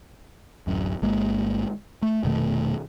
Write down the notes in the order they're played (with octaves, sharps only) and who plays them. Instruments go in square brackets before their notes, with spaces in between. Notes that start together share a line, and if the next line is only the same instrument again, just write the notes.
[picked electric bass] D1 F#2
G1 G#3 A#3
A3
F1 B2 D#3 A3